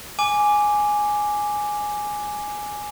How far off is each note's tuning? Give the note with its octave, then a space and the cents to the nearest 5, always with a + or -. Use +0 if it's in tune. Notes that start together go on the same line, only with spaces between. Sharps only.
G#5 +0 D6 +0